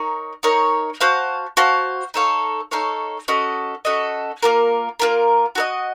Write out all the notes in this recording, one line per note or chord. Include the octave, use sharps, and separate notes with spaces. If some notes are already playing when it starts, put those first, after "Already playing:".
Already playing: D#4 A#4 C#5
D#4 A#4 C#5
F#4 C5 F5 A5
F#4 C5 F5 A5
D#4 A4 C#5 F5
D#4 A4 C#5 F5
C#4 F#4 A4 D#5
C#4 F#4 A4 D#5
A#3 F4 A#4
A#3 F4 A#4
F#4 A4 D#5